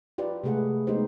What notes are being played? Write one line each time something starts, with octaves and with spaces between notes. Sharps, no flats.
F4 G4 B4 D5
C3 G#3 A3 G#4 B4 F#5
G#3 A3 B3 D#4 G4 C5